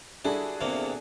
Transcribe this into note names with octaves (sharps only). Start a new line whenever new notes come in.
G3 D4 E4 F#4 G#4 A4
E2 C3 A#3